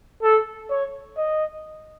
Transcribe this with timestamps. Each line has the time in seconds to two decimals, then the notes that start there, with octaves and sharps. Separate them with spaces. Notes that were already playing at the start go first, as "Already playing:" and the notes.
0.23 A4
0.70 C#5
1.17 D#5